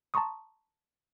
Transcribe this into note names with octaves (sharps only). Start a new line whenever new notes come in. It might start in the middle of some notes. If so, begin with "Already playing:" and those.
A5 A#5 C6 C#6 D#6